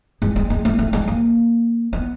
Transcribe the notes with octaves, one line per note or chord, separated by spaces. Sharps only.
G#3
G#3
G#3
A3
A3
G#3
A#3
B3